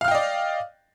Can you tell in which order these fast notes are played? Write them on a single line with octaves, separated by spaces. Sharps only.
F5 F6 G5 D#5 D5